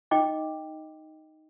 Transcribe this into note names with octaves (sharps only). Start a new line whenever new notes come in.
D#4 D#5 G5 D6